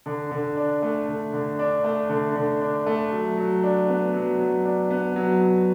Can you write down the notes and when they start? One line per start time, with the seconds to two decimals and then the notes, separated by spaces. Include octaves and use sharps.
0.06 D3
0.31 D3
0.57 D4
0.82 A3
1.08 D3
1.33 D3
1.59 D4
1.84 A3
2.09 D3
2.35 D3
2.61 D4
2.86 A3
3.12 F#3
3.37 F#3
3.63 D4
3.88 B3
4.13 F#3
4.39 F#3
4.65 D4
4.90 B3
5.16 F#3
5.41 F#3